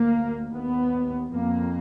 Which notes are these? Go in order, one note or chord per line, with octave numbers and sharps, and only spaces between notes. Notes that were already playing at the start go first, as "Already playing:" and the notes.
Already playing: D2 A#3
D#2 B3
F2 A#3